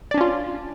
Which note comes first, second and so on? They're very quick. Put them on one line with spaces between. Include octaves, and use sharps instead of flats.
D5 D4 C#4 F4